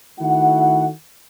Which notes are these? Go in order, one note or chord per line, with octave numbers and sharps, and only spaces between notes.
D#3 A3 E4 F#4 F#5